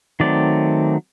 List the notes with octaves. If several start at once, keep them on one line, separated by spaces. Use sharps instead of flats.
D#3 F#3 A3 C4 D5